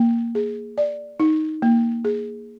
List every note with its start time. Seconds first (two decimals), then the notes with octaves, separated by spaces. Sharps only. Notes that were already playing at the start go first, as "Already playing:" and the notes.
Already playing: A#3
0.35 G#4
0.78 D5
1.20 D#4
1.62 A#3
2.05 G#4